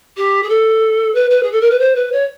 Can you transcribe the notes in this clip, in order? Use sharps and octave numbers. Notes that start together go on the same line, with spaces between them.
G4
G#4
A4
B4
B4
G#4
A4
A#4
B4
C5
B4
C#5